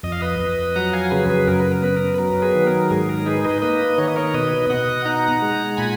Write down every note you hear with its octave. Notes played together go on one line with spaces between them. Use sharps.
F2 D#5
F5
B4 D#5
F2
F#3 F#5 A#5
F5 G#5
C#3 G#4 B4
G#4 B4
F#2 A#4
B4
A#4
B3 B4
A#4
B4
F#3 A#4
G#4 B4
D#3
A#4
G#2 G#4
A#4
D#4 G#4 B4
B4 D#5
A#3 B4 D#5
D#3 C#5
D#5
A#4 C#5
B2 B4 D#5
B2 D#5 F#5
D#4 F#5 A#5
G#3
A#2 G#5 B5